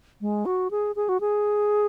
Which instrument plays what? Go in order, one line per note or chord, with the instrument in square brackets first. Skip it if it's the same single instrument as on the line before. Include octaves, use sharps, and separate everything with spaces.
[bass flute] G#3
F#4
G#4
G#4
F#4
G#4